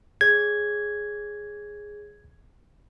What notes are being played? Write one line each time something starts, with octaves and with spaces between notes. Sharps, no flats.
G#4 C#5 G#6